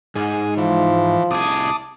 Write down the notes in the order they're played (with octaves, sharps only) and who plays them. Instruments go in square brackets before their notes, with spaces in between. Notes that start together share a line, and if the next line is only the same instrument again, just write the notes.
[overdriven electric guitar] G#2 [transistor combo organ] G#4
[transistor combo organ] E3 [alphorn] F3
[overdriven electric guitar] C2 G#4 [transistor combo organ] A5 D6 D#6